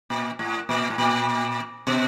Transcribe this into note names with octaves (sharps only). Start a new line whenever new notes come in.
A#2
A2
A#2
A2
A#2
B2